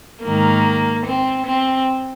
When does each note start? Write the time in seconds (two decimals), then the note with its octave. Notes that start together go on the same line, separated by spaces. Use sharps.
0.24 G#2 D#3 A#3
1.05 C4
1.45 C4